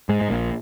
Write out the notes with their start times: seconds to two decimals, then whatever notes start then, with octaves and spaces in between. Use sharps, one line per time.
0.09 G#2 G#3
0.21 G#2
0.30 A#1 A#2